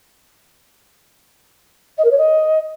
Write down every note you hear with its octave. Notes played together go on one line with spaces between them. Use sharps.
D#5
A#4
C#5
D#5